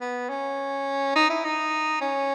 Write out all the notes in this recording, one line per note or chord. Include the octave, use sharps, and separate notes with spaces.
B3
C#4
D#4
E4
D#4
C#4